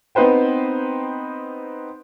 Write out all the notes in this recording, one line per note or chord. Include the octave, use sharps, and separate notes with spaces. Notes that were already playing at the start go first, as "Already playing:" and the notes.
B3 C4 D#4 B4 C5 G5